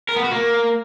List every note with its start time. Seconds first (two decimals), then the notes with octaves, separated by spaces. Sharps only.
0.09 A#4
0.16 B3
0.24 F#4
0.32 A#3